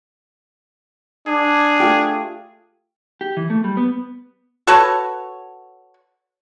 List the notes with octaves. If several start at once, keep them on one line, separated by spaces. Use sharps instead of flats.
D4 G#4
A3 F4 G4
G4
E3
A3
G3
B3
F#4 A4 B4 C#5